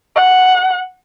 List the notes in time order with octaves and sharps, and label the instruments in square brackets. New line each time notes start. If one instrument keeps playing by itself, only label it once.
[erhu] F#5